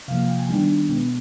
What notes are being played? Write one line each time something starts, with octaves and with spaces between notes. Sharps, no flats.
C3 F3 A#3 F5
F5
G5
G#5
D#3 G3 B3 D4 G5
B2 G#3 B3